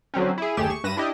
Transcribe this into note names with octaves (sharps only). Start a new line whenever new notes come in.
D3 F#3 C4 C#4
E4 G#4
G1 D#2 A3 G4 G#4 E7
C#6
G2 B4 A#6 D#7 E7
D4 E4 G4 D#5